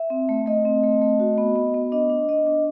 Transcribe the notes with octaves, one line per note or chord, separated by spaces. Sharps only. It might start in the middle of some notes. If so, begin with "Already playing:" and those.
Already playing: E5
C4
A3
A3 D#5
C4
A3
A3
F#4
B3
B3
B3
D4 D#5
D4
D4 D#5
D4